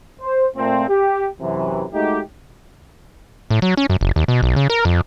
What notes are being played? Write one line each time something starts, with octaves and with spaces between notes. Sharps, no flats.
C5
A#2 A3 C4
G4
F#2 C3 E3
G#3 A3 D#4 F#4 G4
A2
F#3
C#4
F#2
F#1
D#2
B2
B1
C#3
A#4
F2